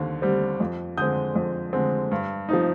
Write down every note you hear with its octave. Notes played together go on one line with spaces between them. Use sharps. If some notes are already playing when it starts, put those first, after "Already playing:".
Already playing: D#2 D3 C4
D3 G3 C4
F2
D3 G#3 C4 D#6 G6
F2
D3 G#3 C4
G2
F3 C4 D#4